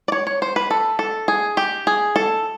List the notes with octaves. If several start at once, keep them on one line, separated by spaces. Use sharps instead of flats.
D5
C#5
C#5
C5
B4
A4
A4
G#4
G4
G#4
A4